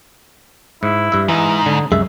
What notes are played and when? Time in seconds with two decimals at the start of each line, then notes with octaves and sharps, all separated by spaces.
0.83 G#2 E4
1.12 G2 E5
1.28 G#2 E3 D#4
1.66 D3
1.92 C2 F#2 G#3 E5